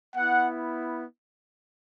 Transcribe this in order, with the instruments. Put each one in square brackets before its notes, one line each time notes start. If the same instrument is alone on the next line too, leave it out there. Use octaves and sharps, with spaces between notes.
[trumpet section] B3 E4 F#5